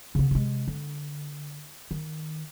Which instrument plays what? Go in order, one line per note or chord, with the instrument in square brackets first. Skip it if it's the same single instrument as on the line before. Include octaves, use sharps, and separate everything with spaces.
[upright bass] C#3 B3
C3 G#3
D3
D#3